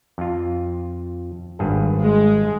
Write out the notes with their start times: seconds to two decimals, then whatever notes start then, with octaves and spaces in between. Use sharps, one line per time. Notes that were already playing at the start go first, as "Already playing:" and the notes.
0.18 F2 F4
1.59 G#1 G2 G#4
2.01 G#3